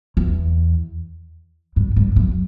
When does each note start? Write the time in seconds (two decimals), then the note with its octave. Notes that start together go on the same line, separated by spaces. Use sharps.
0.17 E2
1.76 G2
1.96 G2
2.16 F#2